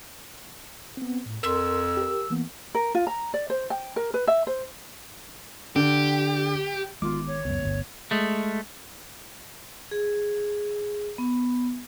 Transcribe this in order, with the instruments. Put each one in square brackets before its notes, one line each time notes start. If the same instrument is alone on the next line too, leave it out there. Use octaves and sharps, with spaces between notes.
[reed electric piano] B3 C4
A2
[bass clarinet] F2 [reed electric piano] A#4 C6 [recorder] E6
[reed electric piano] G4 A#4
E3 A#3 B3
[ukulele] A#4
F4
A#5
D5
C5
G5
A#4
B4
E5
C5
[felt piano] D3 [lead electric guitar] G4
[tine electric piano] G#1 D#3 D6 [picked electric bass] G#3 B3 [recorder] F4
[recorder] C#5
[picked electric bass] C#2 F#2 [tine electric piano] B3
[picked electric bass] G1 D2
[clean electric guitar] G#3 A3
[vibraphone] G#4
B3